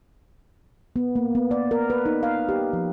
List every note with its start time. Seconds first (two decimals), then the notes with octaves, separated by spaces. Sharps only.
0.96 B3
1.16 A#3
1.35 B3
1.51 D5
1.71 A#4
1.90 B4
2.06 D#4
2.23 F5
2.49 G4
2.73 F3